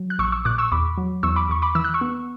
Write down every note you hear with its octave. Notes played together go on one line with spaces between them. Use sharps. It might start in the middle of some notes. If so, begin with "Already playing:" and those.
Already playing: F#3
F#6
A#1 C#6 E6
C#6 E6
A#2 D6 F#6
C#6 E6
E2 B5 D6
F#3
E2 C#6 E6
B5 D6
E2 C#6
B5 D6
E3 E6
F#6
C#6 E6
B3